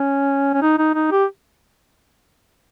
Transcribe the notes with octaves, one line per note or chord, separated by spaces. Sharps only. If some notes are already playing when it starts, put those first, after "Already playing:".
Already playing: C#4
C#4
D#4
D#4
D#4
G4